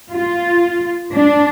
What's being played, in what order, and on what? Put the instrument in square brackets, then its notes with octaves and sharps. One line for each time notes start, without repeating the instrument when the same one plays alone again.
[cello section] F4
D4